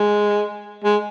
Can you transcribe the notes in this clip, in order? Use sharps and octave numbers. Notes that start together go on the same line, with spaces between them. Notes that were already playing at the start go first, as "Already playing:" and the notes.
Already playing: G#3
G#3